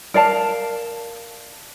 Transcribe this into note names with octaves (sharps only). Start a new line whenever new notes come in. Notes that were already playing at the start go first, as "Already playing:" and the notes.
A#4 D5 F5 A5